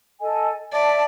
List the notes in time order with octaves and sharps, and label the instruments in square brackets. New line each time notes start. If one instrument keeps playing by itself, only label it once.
[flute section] A4 D#5 G#5
[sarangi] D5 [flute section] E5 A5